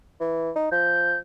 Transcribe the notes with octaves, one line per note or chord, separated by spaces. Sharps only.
E3
D#4
F3 G6